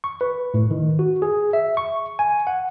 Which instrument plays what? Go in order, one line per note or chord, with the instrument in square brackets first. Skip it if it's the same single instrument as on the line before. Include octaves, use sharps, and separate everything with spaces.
[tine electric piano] C#6
B4
A2
D#3
F#4
G#4
E5
C#6
G#5
F#5